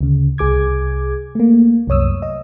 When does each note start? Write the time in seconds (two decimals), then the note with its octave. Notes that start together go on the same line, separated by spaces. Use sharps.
0.01 D2 C#3
0.38 C2 G#4 D6 G#6
1.35 A3 A#3
1.87 C2 F#2 C#5 D#6 E6
2.22 D#5